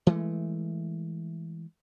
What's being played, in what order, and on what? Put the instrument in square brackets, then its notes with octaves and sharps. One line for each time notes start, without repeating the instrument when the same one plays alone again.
[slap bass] E3 G#3 A3